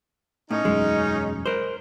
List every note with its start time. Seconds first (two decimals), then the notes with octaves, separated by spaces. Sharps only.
0.50 A2 C#4 D#4
0.65 E1 F#2 G#3
1.46 A#4 C5